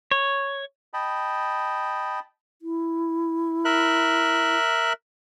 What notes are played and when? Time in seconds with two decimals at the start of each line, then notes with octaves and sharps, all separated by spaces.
0.11 C#5
0.94 D#5 G5 A5 B5
2.62 E4
3.65 A#4 E5 F#6